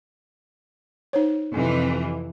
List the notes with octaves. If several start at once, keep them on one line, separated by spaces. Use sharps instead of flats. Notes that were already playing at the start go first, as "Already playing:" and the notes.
D#4 C5 C#5
F2 C3 E3